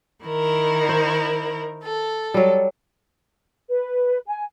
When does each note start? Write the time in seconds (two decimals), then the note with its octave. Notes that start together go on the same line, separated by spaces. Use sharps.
0.24 D#3 E4 A#4
0.89 C5
1.83 A4
2.34 F#3 G3
3.70 B4
4.28 G#5